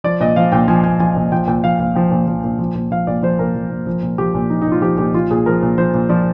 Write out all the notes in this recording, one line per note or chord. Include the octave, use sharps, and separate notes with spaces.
F3 D5
A#2 D#5
F3 F5
A#2 G5
F3 G#5
A#2 G#5
F3 G#5
A#2
F3 G5
A#2 G5
F3 F5
A#2 F5
F3 G5
A#2
F3
A#2
F3
A#2
F3 F5
A#2 D5
F3 C5
A#2 A#4
F3
A#2
F3
A#2
F3 G4
A#2
F3 D#4
D#4
A#2 F4
F3 G4
A#2 G4
F3 F4
A#2 G#4
F3 A#4
A#2
F3 C5
A#2
F3 D5